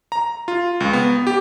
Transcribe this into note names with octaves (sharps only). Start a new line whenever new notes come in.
A#5
F4
C#2
B3
G4